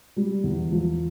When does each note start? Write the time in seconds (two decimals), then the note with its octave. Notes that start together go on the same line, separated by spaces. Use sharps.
0.17 G3
0.44 E2
0.71 F3